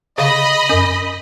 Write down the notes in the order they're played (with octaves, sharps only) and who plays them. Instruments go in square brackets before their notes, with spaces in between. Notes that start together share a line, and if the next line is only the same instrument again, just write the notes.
[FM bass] C#3 [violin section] D#5 B5
[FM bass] F#2